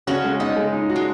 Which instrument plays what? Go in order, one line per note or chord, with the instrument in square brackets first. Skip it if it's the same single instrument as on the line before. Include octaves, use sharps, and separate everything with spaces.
[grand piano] C#3 [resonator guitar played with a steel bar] C#4 F#4
[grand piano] G#3
[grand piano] C#3 [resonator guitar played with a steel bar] B3 D#4
[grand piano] G#3
D#4
F#4
[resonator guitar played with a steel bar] G#3